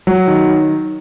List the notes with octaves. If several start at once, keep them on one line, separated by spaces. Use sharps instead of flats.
F#3
D#3